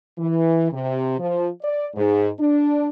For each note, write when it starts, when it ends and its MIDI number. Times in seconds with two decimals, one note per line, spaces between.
0.18 0.72 52
0.72 1.14 48
1.19 1.47 53
1.62 1.87 74
1.95 2.27 44
2.39 2.88 62